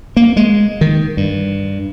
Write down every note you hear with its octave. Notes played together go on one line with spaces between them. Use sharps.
A#3
G#3
D#3
G2